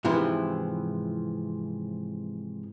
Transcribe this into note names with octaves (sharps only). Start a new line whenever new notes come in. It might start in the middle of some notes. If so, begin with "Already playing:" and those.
G#2 C3 E3 F3 E4